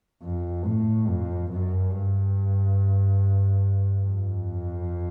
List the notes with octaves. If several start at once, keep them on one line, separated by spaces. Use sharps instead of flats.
F2
A2
F2
F#2
G2
F2